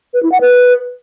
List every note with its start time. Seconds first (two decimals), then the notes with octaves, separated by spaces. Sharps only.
0.14 B4
0.23 E4
0.32 F#5
0.41 B4